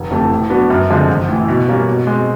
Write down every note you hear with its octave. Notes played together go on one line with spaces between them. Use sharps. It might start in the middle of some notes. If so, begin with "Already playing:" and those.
Already playing: F1
F2 C3 E3 A3
A2
F#3 B3 D4 F#4
F#2
D3 F3 G#3 C4
A1
A2 E3
B2
G3 A#3 C#4
B2
G#3 C4